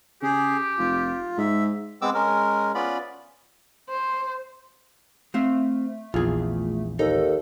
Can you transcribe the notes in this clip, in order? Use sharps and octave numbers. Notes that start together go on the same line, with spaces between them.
C#3 G4 G#4
F1 F4
G#2 E5
G#3 B3 C4 D6 E6
G#3 C#4 A#4
B3 C#4 F4 D5 B5
C5
A3 C4 C5 F5
A#1 E2 F4 G#4
D#2 D#4 A4